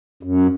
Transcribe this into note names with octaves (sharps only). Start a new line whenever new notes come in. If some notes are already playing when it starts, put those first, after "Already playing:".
F#2